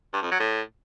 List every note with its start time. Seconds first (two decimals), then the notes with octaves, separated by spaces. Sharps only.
0.14 G2
0.22 F2
0.31 F#3
0.40 A2